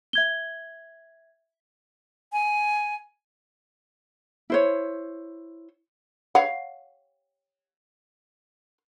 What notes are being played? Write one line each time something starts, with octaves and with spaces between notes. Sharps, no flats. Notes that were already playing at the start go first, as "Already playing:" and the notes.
E5 G#6 G7
G#5
E4 C5 C#5
C#5 F5 F#5